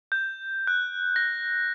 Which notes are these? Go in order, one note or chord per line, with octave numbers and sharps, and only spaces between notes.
G6
F#6
A#6